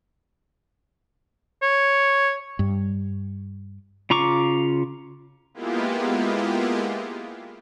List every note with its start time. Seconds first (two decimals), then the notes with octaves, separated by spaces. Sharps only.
1.62 C#5
2.59 G2
4.10 C#3 F4 A#5 C#6 D6
5.54 G#3 A#3 B3 E4 F4 G4